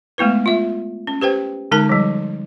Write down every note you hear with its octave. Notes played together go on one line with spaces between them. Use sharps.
G#3 A3 B3 E4 B4
F4 E5
C#4
G4 B4 C5 G5
D3 G#3 D#4 A#4 A5
F3 G3